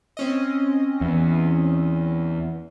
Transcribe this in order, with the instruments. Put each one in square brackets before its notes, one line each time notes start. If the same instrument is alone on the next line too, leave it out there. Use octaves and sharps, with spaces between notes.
[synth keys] C4 C#4 D#5
[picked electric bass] E2